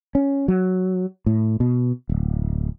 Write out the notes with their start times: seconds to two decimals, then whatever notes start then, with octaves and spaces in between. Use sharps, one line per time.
0.15 C#4
0.48 F#3
1.26 A2
1.60 B2
2.09 D1